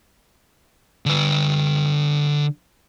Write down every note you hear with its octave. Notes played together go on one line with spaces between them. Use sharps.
D3 B4